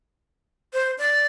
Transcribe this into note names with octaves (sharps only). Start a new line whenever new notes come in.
C5
D5